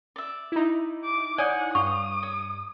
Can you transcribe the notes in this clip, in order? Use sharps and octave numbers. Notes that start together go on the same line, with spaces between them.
D5 E5
D#4 E4
D6
C#5 D5 F#5 G#5 D#6
G2 F5 C#6 D#6
C#5